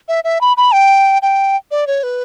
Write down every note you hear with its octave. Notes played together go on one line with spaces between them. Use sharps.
E5
E5
B5
B5
G5
G5
D5
C#5
B4